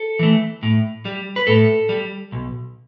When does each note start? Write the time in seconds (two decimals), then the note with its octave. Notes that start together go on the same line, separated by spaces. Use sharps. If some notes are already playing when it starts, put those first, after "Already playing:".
Already playing: A4
0.19 E3 A3
0.63 A2
1.05 G3
1.36 B4
1.47 A2 A4
1.89 G3
2.32 B1